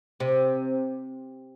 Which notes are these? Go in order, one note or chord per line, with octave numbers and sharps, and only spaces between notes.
C3